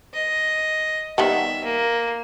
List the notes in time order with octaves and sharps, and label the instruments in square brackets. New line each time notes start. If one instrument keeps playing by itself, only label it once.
[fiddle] D#5
[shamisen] D#3 G3 B3 [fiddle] E5
[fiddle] A#3